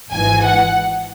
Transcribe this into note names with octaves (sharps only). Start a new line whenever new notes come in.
G#1 G#2 E3 G#5
F#5